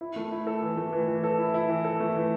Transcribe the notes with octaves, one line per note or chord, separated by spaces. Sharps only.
E4
A3
E4
A4
E3
A3
E3
E3
A4
E4
E4
E3
A4
A3
E3